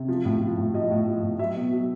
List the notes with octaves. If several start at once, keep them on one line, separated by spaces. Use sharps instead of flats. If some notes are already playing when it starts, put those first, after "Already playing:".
Already playing: C3
F3
A2
F3
A2
F3 D#5
A2
F3
A2
F#3 E5
B2
F#3